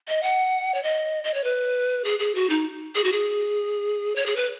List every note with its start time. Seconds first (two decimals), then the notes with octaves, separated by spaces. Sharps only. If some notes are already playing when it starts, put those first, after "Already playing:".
0.08 D#5
0.23 F#5
0.74 C#5
0.83 D#5
1.24 D#5
1.34 C#5
1.44 B4
2.05 G#4
2.19 G#4
2.35 F#4
2.49 D#4
2.95 G#4
3.04 F#4
3.12 G#4
4.16 C#5
4.26 G#4
4.36 B4